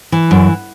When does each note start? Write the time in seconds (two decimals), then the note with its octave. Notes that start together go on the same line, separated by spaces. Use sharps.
0.12 E3
0.31 F#2